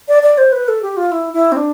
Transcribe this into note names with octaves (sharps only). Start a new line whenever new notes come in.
D5
D5
C5
B4
A4
G4
F4
E4
E4
C4
D4